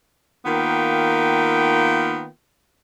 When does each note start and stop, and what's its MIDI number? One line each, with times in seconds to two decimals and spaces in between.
0.46 2.27 51
0.46 2.27 58
0.46 2.27 59
0.46 2.27 65
0.46 2.27 79